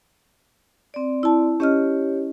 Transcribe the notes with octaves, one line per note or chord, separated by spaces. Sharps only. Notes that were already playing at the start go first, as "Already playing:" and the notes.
C4 D5
E4 A5
C#4 G4 C#5 D#5 F6